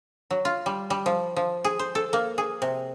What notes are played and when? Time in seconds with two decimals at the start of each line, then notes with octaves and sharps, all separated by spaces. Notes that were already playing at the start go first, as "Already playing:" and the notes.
0.31 F#3
0.45 F4
0.66 G3
0.90 G3
1.06 F3
1.36 F3
1.64 G#4
1.79 C5
1.95 A4
2.13 A#3
2.38 G#4
2.62 C3